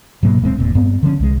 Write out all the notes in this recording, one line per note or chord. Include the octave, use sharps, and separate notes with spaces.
G#2 B2 F#3 A#3
D1 G#3 A#3 C4
E1 A#2
G2 B3 C4
D3 F3 B3 C#4
C2 G#3